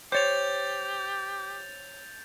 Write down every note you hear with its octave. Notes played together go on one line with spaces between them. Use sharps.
G4 C5 C#5 G6 A6 F7